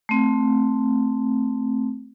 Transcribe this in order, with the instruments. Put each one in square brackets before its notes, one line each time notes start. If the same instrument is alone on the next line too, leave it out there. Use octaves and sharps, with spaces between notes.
[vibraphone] A3 C4